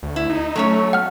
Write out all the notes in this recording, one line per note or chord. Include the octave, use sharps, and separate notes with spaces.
D2
E4
D#4
F#3 A3 C#4 C#5
F#5 F6